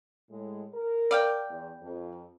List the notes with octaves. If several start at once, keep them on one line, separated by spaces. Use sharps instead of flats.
A2 G#3
A#4
D5 F5 G5
E2
F2